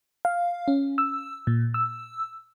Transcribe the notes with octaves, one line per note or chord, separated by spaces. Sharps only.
F5
C#4
E6
A#2
E6